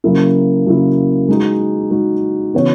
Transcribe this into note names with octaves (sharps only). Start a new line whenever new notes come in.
C#3 F#3 A#3 E4
C#3 F#3 A#3 E4
G#3 D#4 F#4
G#3 D#4 F#4
C#3 E3 B3 F#4 C#5